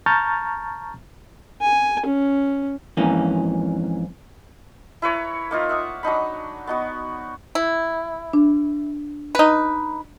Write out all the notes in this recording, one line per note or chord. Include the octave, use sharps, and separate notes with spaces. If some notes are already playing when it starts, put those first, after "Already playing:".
A5 A#5 C#6 F6 G6 A6
G#5
C#4
F2 G#2 E3 A#3 C#4
E4 B4 C#5 A#5
A#3 D#4 F4
E5 F#5 D#6
F#3 D4 D#4 B5
B3 D#4 F#4
E4
D4
D#4 B4